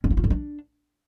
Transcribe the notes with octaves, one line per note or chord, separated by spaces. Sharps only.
C#4
E4
F4
D3
D4